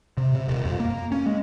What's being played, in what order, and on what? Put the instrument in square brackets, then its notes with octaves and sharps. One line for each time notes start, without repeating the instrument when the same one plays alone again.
[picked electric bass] C3
C3
D#1
F2
A#3
C#4
G#3